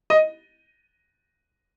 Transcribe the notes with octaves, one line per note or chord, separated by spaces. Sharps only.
D#5